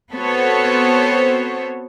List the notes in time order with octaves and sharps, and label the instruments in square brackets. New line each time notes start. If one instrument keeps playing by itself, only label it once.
[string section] B3 C4 F#4 A4 C5 C#5